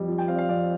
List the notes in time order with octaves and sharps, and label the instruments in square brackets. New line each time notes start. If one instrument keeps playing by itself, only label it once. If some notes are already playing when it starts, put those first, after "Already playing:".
Already playing: [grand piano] F2 G3
F3
G5
C4 F5
D5
F5
F2 D5